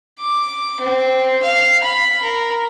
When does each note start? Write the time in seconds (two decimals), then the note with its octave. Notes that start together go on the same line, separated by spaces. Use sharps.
0.20 D6
0.80 C4
1.43 F5
1.83 B5
2.22 A#4